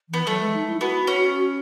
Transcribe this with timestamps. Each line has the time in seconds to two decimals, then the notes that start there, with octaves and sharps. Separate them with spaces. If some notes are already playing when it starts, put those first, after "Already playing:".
0.09 E3 B3
0.27 F#3 A3
0.41 G#3
0.54 D#4
0.68 E4
0.81 B3 F#4
1.07 C#4